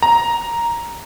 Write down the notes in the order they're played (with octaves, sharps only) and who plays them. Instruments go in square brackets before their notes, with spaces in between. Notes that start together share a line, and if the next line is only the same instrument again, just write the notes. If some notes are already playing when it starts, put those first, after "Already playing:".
[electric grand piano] A#5